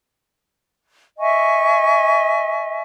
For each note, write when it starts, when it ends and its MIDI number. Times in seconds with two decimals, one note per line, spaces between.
1.19 2.83 75
1.19 2.83 76
1.19 2.83 80
1.19 2.83 85